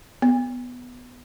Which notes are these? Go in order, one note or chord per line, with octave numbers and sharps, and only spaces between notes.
B3